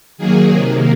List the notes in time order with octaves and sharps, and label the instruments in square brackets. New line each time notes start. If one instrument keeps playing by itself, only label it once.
[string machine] D#3 F#3 A#3 G#4
C3 D#3 A#3